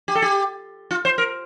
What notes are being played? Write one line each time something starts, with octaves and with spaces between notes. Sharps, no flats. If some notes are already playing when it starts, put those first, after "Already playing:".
G4
A4
G4
F4
C5
A#4